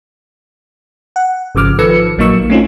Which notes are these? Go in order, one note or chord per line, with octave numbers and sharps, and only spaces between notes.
F#5
G#1 C#3 F3 D6 F6
D#3 F3 A4 B4 E6 C#7
A#1 F#3 A#3 D#4 C#6 E6
A3 C4 C#4 D#4 F4